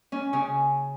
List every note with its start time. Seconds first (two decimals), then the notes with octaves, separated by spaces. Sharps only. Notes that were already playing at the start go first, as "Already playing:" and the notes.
0.12 C#4
0.33 C#3 C#4